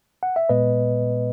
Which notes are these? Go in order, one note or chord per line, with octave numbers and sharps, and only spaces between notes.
F#5
E5
A#2 G#3 B3 B4 D#5